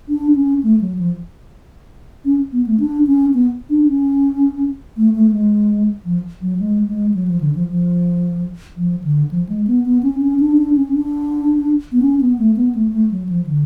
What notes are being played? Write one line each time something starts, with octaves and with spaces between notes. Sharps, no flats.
D4
C#4
A3
F#3
F3
C#4
B3
A3
D4
C#4
B3
D4
C#4
A3
A3
G#3
F3
F#3
G#3
G#3
F#3
F3
D3
F3
F3
F3
D3
F3
G#3
B3
B3
C#4
C#4
D4
D4
C#4
D4
B3
C#4
B3
A3
B3
A3
A3
F#3
F3
D3